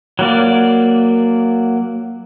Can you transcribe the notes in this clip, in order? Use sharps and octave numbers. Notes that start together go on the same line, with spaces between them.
F#3 A#3 D5